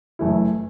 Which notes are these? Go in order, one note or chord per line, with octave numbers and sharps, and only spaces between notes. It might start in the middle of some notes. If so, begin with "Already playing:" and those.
F#1 F#2 E3 A3 E4